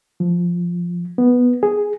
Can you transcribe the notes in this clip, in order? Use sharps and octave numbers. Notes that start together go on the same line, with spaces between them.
F3
B3
G#4